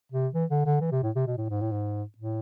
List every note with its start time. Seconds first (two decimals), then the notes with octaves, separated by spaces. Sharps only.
0.12 C3
0.34 E3
0.50 D3
0.66 D3
0.81 E3
0.91 C3
1.03 A2
1.15 C3
1.27 B2
1.37 A2
1.50 G#2
1.61 A2
1.71 G#2
2.18 A2